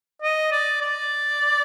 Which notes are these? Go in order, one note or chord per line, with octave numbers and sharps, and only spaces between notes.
D#5
D5
D5